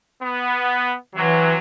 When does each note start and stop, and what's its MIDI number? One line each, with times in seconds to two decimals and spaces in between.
0.22 0.94 59
1.15 1.58 48
1.15 1.56 52
1.15 1.58 54